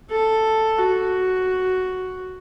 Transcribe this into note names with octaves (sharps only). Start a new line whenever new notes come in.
A4
F#4